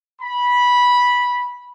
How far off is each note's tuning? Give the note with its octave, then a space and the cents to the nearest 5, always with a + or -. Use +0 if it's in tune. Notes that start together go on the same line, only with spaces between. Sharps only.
B5 -10